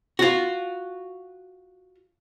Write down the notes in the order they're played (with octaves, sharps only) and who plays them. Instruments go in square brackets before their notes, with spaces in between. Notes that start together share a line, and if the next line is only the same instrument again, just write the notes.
[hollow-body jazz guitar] F4 F#4